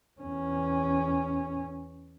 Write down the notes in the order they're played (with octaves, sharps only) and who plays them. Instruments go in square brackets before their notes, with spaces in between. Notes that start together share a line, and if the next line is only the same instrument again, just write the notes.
[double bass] E2 C#4